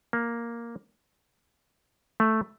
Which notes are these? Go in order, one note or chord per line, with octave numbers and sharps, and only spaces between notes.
A#3
A3